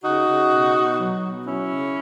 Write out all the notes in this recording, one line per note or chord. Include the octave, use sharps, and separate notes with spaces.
C#3 D#4 F#4
C#3
B2
B2
F#3
B2
F#3 C#4 E4
C#3